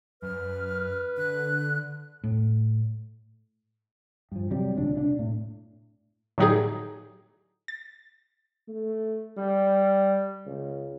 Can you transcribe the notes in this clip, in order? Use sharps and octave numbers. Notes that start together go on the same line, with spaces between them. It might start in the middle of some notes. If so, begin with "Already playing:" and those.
F#2 B4 F6
D3 F#6
A2
G2 F3
C3 F#3 G3
D#1 C#2 D4
C3 D4
A2
A2 D3 F#3 D#4 G4 G#4
A6
A3
G3
C#2